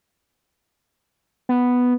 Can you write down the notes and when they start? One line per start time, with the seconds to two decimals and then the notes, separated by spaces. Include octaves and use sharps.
1.49 B3